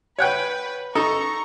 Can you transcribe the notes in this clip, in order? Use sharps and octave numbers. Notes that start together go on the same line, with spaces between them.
B4 C#5 F#5 G5
D#4 A4 A#5 C#6